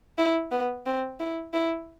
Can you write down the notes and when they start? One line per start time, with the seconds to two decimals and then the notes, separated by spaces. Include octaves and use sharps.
0.18 E4
0.52 B3
0.86 C4
1.20 E4
1.53 E4